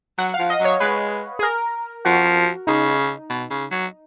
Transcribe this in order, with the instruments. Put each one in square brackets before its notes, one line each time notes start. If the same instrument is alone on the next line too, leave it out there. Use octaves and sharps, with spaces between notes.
[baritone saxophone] F#3 [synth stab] F#5
[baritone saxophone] F3 [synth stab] F5
[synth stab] D#5
[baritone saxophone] F#3 [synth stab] C#5
[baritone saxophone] G#3 [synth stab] B4
[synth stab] G#4
A#4
[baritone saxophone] F3 [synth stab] F#4
[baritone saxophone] C#3 [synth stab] D#4
[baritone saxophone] B2
C#3
F#3